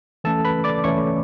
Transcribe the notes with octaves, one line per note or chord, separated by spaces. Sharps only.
E3 A3 C#4 A4 A5
B4 B5
D5 D6
E3 A3 C#4 C#5 C#6